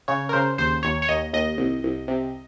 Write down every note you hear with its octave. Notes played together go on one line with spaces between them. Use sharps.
C#3 C#5
A#4
C#3 C5
D#2 C5
D#2 C#5
C#5
D#2 D#5
D#2 D#5
C2
C2
C3